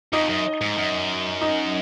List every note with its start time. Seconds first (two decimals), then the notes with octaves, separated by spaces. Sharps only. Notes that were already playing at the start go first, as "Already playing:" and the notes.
0.13 F2 D#4 D#5
0.29 F#2
0.61 G#2
0.78 F#2
1.41 D#4 D#5